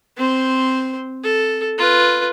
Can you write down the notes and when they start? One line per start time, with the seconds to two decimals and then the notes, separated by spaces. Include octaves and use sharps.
0.18 C4 C5
1.24 A4
1.78 F4 B4